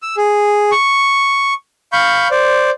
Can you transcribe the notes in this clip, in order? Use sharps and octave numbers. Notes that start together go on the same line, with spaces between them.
E6
G#4
C#6
F5 B5 C#6 G6
C5 D5